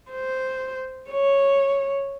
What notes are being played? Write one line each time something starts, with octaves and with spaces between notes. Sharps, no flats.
C5
C#5